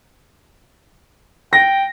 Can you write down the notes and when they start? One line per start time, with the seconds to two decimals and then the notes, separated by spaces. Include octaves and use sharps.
1.53 G5 A#6